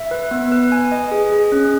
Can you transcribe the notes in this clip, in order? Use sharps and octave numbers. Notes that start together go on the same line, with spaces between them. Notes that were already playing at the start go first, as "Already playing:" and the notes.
Already playing: E5
B4
B3
B4
G#5
D#5
G#4
G#4
C#4